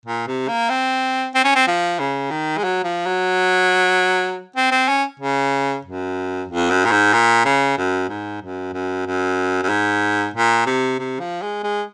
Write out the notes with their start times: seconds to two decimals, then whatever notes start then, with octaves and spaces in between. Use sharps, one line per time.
0.06 A#2
0.28 C3
0.48 A#3
0.70 C4
1.35 C4
1.44 C#4
1.55 C4
1.67 F3
1.99 C#3
2.31 D#3
2.58 G#3
2.64 F#3
2.84 F3
3.06 F#3
4.56 C4
4.71 C4
4.89 C#4
5.20 C#3
5.85 F#2
6.49 F2
6.71 F#2
6.85 A#2
6.91 G#2
7.13 A#2
7.45 C#3
7.77 F#2
8.09 G#2
8.42 F#2
8.73 F#2
9.06 F#2
9.63 F#2
9.70 G#2
10.34 A#2
10.66 C3
10.99 C3
11.20 F3
11.42 G#3
11.63 G#3